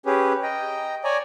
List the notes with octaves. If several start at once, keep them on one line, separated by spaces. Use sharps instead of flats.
C#4 G4 G#4 B4
D#5 G5 A#5
C#5 D5 G#5 A#5